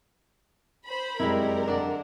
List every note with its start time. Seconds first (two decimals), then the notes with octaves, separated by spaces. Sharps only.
0.86 C5 B5
1.20 F1 F#2 G3 G#3 C4 D#4 E4 A#4
1.68 D3 D4 D5